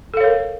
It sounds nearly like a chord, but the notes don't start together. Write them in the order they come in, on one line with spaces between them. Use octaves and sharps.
A4 F5 C#5 A#4